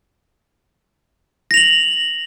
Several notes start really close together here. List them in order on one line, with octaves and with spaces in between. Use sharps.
A#6 F7 F#7